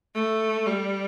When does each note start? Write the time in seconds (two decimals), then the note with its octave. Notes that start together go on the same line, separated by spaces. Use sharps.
0.15 A3
0.66 G3